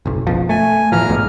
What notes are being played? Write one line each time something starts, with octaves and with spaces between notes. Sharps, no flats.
F#1 B1
F#1 B2 F3
A3 G#5
E2 A2 E3 F3 A#5 F6
B1 G#2 B2